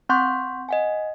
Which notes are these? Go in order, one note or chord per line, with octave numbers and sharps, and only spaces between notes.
C4 F#5 C6 C#6 G6
D#5 F#5 G#5